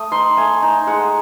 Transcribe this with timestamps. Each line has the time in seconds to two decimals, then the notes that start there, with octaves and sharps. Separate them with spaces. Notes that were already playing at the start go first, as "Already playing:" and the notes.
Already playing: A3 D#6
0.12 D#4 C6
0.37 A3 G#5
0.62 D#4
0.87 G#3 F#5